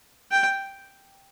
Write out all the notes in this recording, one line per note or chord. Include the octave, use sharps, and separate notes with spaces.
G5